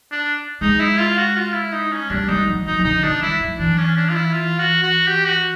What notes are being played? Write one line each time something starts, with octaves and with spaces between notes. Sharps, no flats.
D4
G#3 D#4
E4
F4
F#4
F4
E4
D#4
C#4
G3 D4
G3 D#4
F#3
F3 D#4
D#3
D3 D#4
D#3 D4
G3 E4
F#3
E3 D4
C#4
D4
F4
E4
F4
F#4
F#4
G4
F#4